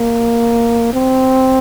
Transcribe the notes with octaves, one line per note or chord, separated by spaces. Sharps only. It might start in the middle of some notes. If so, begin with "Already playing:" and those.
Already playing: A#3
C4